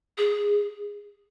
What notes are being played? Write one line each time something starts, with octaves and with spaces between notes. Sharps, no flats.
G#4